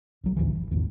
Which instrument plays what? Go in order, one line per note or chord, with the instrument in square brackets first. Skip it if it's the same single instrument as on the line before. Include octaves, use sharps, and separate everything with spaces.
[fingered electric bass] B1 F#3
D#1 A1 D2 E3
F#1
A#1 E2 G#2 D#3